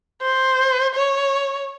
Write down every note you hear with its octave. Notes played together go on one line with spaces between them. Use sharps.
C5
C#5